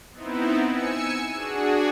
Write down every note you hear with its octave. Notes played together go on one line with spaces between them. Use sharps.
B3 C4 D#4 E4
G#5 E6 C#7
D4 F#4 G#4